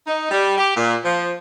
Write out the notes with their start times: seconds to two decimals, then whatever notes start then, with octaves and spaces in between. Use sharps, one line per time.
0.07 D#4
0.31 G3
0.58 G4
0.76 A#2
1.04 F3